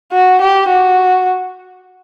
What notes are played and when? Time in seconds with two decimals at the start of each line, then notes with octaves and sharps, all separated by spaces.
0.13 F#4
0.41 G4
0.69 F#4